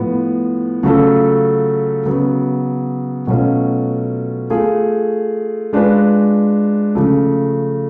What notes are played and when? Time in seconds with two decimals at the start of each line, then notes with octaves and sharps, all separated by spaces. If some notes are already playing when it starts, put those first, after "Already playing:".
Already playing: A2 F3 B3
0.83 C#3 F#3 A3 F4 A4
2.05 C#3 F#3 B3
3.27 B2 F#3 A3 C#4 F4
4.50 A3 F4 G#4
5.73 G#3 D4 F4 B4
6.95 C#3 F3 A3